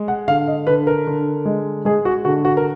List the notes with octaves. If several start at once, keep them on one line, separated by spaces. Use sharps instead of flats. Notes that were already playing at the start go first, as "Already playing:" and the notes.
Already playing: G#3
F#5
D3 F5
D#5
D3 B4
A#4
D3
G#3
G#3 G#4
F#4
D3 F#4
F#4
A#4